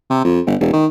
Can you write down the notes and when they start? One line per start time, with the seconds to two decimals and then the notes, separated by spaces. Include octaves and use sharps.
0.10 C3
0.25 F2
0.47 G1
0.60 E1
0.73 D#3